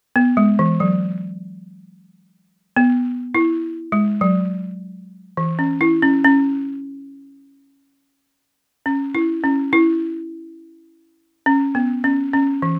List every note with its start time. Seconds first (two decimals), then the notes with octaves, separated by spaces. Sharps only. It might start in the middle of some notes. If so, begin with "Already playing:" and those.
0.16 B3
0.37 G#3
0.59 E3
0.80 F#3
2.76 B3
3.35 E4
3.92 G#3
4.21 F#3
5.37 E3
5.59 C#4
5.81 E4
6.02 C#4
6.24 C#4
8.86 C#4
9.15 E4
9.44 C#4
9.73 E4
11.46 C#4
11.75 B3
12.04 C#4
12.33 C#4
12.62 E3